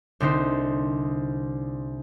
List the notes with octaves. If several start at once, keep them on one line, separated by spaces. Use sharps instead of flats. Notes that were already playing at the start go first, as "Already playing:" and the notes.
C2 D3 C4 D#4 C5